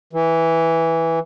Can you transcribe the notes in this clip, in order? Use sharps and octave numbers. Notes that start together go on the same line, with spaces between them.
E3